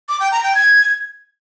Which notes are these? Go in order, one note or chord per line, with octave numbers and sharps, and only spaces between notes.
D6
G5
A#5
G5
G#6